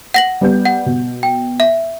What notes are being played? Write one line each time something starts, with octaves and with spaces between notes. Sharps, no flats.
F#5 A#6 F#7
G3 B3 G6
F#5
B2
G5
E5